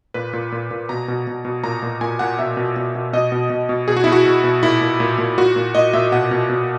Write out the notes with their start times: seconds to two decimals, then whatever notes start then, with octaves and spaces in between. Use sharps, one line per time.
0.14 A#2 B4
0.33 A#2
0.52 A#2
0.71 A#2
0.89 B2 A#5
1.08 B2
1.27 B2
1.45 B2
1.64 A#2 A#5
1.83 A#2
2.01 A#2 G#5
2.19 A#2 F#5
2.39 B2 E5
2.57 B2
2.76 B2
2.95 B2
3.13 B2 D#5
3.32 B2
3.50 B2
3.69 B2
3.88 B2 G#4
3.97 F#4
4.04 B2 E4
4.12 F#4
4.26 B2
4.44 B2
4.63 A#2 E4
4.81 A#2
5.00 A#2
5.18 A#2
5.38 A#2 F#4
5.56 A#2
5.75 A#2 D#5
5.93 A#2 E5
6.12 B2 F#5
6.31 B2
6.50 B2